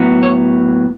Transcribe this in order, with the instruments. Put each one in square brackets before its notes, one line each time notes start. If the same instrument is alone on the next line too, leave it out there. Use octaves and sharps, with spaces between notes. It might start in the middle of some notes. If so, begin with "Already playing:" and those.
Already playing: [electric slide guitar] A2 F#3 B3
C#5